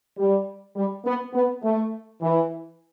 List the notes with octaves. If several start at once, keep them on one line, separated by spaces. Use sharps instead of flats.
G3
G3
B3
B3
A3
E3